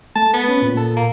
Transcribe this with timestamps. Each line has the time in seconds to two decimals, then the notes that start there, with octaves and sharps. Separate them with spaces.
0.16 A3 A5
0.33 B3
0.48 C#4
0.62 A#2
0.77 A4
0.96 A#3